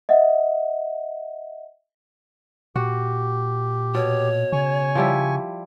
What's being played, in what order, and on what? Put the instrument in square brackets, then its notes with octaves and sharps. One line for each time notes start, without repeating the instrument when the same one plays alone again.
[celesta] D#5 E5 F#5
[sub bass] A#2 [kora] F#4 [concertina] G4
[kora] B2 [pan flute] C#5
[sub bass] C#3 [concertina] G#5 C#6
[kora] F3 G3 E4